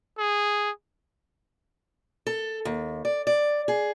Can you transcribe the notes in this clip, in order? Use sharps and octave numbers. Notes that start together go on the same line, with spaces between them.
G#4
A4
D#2
D5
D5
G#4